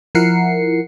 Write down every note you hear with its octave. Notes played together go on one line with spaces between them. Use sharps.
F3 E4 A#4 F#5 C7 C#7